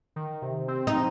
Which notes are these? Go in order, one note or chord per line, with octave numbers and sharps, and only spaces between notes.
D#3
C3
C4
D#4
F3